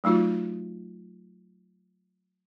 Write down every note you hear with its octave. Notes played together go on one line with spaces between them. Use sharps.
F#3 A3 D#4 F4 F#4